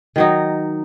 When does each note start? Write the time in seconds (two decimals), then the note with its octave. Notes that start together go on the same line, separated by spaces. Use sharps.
0.16 D#3 F#3 D#4